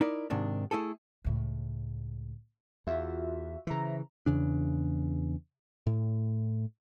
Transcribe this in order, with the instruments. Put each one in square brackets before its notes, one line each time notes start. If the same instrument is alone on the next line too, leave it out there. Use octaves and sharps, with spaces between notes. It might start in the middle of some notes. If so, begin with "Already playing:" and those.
[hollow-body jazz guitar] D#4 E4 A#4 D5
G#2 C3 D#3 D4
A3 E4 G#4 A4
[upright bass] C#2 A2
[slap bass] E2 [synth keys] F4 F#4 E5
[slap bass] C#3 E3 [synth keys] C5 E5 A#5
[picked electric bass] E2 C#3 D4
A2